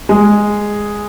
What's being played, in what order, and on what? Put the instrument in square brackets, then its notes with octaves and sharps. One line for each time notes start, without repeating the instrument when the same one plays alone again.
[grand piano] G#3